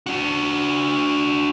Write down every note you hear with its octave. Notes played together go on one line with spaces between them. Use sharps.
D4 F#4